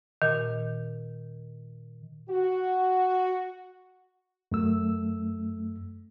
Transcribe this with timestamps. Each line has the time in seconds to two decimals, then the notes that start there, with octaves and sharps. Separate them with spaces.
0.22 A#2 D#3
2.30 F#4
4.52 F#2 A3 E6